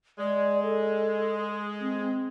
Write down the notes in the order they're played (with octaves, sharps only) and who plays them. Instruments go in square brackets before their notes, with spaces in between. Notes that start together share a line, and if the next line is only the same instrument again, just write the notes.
[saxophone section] G#3 [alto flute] D5
[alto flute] A4
C4